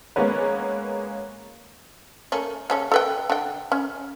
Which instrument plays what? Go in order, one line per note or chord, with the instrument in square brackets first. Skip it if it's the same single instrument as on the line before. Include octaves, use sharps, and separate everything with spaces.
[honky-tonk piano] G#3 A#3 B3 C#4 B4
[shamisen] A3 A#3 C#4
C#3 C#4 A4
A4 B4 G5
D3 G5
C#4